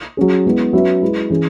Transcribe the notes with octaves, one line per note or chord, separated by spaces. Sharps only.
F#3 C#4 G#4
G#3 B3 E4
F#3 C#4 F#4 B4 E5
G#3 E4 B4
E3 C#4 G#4